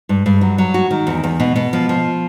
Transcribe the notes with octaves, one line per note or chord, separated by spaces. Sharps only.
G2
G2
F#3
F#3
F#4
D#3
E2
E2
B2
B2
F3
F3